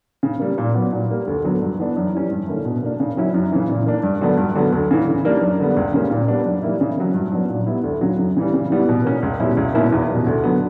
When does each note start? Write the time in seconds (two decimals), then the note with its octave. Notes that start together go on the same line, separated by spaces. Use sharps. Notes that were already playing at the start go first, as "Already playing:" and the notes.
0.23 C#3
0.40 G3 A#3
0.58 A#2
0.74 F#3 B3
0.92 A#2
1.10 G3 A#3
1.27 D2
1.44 D3 F#3 B3
1.61 G2
1.78 E3 B3 D4
1.97 F#2
2.13 E3 G3 C#4
2.31 G2
2.47 D3 A#3 C#4 E4
2.65 B2
2.83 A#3 D4
3.00 C#3
3.17 F#3 C#4 E4
3.34 F#2
3.52 C#3 E3
3.69 A#2
3.86 A#3 D4
4.03 G2
4.21 D3 F#3 B3 D4
4.38 G2
4.55 D3 F#3 B3
4.72 D2
4.91 C#3 E3
5.07 C#3
5.24 G3 A#3 D4
5.41 F#2
5.60 D3 G3 B3
5.77 C#2
5.94 C#3 G3 A#3 C#4
6.11 A#2
6.28 G3 B3 D4
6.46 F#2
6.63 E3 G3 A#3 E4
6.81 C#3
6.98 F#3 C#4 E4
7.14 G2
7.32 F#3 B3 D4
7.49 A#2
7.66 G3 B3 E4
7.84 D2
8.01 C#3 F#3
8.18 F#2
8.37 C#3 E3 G3
8.54 C#3
8.71 E3 G3 B3
8.89 B2
9.05 A#3 C#4
9.23 C#2
9.40 B2 G3 C#4 E4
9.57 C#2
9.74 B2 A#3 C#4 E4
9.92 E2
10.09 B2 G3
10.27 D2
10.44 D3 F#3 B3